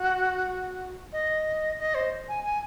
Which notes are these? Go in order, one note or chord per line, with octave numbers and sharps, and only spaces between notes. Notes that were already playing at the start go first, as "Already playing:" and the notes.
Already playing: F#4
D#5
D#5
C5
G#5
G#5